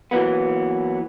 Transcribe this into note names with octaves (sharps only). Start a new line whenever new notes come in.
E3 F#3 A#3 B3